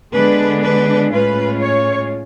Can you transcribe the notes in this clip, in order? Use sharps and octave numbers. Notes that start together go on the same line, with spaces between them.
D3 G#3 B3 D4 B4
B4
A2 G#3 C#4 F4 B4
C#5